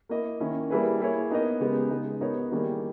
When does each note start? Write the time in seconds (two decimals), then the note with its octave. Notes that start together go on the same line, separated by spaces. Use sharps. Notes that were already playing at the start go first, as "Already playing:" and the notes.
0.09 A#3 E4 A#4 D#5
0.40 D#3 A#3 C#4 E4
0.70 G3 A#3 E4 G#4 B4
1.00 A#3 E4 G#4 C#5
1.31 B3 D#4 A#4 D#5
1.60 C#3 G#3 B3 G4 A#4
1.91 C#3 G#3 D#4
2.21 B3 D#4 G4 A#4 C#5
2.51 D#3 G3 A#3 E4 G#4